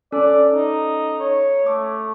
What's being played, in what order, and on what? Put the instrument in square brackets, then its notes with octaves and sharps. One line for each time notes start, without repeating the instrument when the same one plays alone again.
[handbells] C#4 A4 [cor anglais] D5
[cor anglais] D#4
C#5
[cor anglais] A3 [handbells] D6